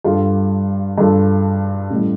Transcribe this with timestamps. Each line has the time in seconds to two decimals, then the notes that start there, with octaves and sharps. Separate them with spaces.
0.04 G2 G3 F4 A4
0.98 G2 G3 F4 A4
1.90 A1 A2 G3